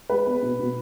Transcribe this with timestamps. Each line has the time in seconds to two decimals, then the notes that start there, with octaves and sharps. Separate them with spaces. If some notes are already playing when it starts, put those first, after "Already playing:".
0.10 G#3 B4
0.27 B3
0.42 B2
0.59 B2